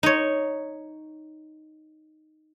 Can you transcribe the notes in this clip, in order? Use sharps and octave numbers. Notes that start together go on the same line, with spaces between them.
D#4 C#5